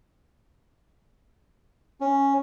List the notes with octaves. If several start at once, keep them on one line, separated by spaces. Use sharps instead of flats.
C#4